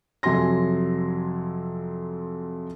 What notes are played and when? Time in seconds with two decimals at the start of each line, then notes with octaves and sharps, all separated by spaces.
0.23 F2 C3 F#3 G#5 C6 A#6